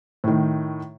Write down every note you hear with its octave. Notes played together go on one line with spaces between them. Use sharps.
A2 D#3